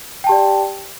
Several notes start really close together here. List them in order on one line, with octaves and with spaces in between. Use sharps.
G5 A5 G4 D5